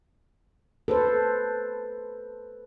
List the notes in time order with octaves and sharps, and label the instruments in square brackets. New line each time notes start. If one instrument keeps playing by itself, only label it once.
[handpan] A4 B4 C5